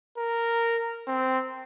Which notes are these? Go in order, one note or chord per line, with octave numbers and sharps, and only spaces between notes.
A#4
C4